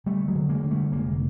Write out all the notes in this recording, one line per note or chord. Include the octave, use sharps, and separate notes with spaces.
D3 G3 A3
F#3 G#3
D3
G#3 A#3
D3
G3 A3
F1 G#3 A#3